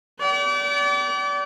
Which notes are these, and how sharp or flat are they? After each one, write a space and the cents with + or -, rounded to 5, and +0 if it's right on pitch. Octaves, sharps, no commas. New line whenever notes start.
D5 -30 G5 -45